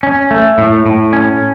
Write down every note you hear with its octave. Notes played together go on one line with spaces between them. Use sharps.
C#4
A3
A2
A2
C#4